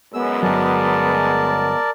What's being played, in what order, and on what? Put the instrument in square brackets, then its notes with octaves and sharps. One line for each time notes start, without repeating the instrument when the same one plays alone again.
[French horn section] F#2 G#3 [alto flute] B3 [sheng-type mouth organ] E6
[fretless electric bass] G1 F#3 [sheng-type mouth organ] A#4 D5 A5